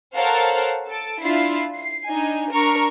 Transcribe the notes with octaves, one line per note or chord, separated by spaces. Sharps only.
A4 A#4 C5 C#5 F5 F#5
A4 D7
D4 E4 F4 C7
C7
D4 D#4 G#5
D4 A#4 A#5 C#6 C#7